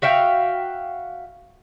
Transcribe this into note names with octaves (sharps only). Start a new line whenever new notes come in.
F#4 E5 F5 G5